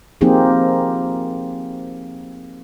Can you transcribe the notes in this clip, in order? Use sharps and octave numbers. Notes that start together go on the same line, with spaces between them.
F3 A#3 C4 D#4 G4 G#4